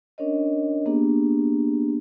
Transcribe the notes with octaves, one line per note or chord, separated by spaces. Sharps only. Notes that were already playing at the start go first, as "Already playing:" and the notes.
C#4 D4 A#4 C#5 D#5
A#3 B3 D4 G4 G#4